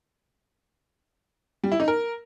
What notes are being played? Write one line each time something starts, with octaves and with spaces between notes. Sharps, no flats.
G3
E4
D#4
A#4